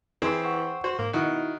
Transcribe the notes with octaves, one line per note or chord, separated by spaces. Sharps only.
E3 C4 G#4 C5
F#5 C#6
F#4 C5
G#2 A#3
B2 D#3 D#4 E4 F#4